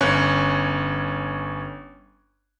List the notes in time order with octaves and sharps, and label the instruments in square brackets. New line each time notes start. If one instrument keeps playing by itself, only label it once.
[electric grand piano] G1 C#4 C#5 F#6